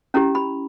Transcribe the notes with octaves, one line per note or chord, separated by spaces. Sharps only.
C#4 E4 G4 A#5
B5